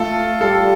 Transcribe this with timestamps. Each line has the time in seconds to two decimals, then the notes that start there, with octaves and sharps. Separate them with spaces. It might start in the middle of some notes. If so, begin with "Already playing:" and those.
Already playing: A3 F4 A4
0.41 G3 F4 A4